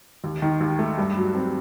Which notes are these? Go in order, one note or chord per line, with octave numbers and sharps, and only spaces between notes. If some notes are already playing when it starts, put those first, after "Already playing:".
D#2
D#3
D#2
A3
G2
F#3
C4